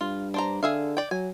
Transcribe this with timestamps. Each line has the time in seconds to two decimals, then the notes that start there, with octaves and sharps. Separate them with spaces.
0.01 G2 F4
0.34 D4 C5 A#5
0.63 D3 G#4 E5 F5
0.97 D5 G5
1.11 F#3 G#5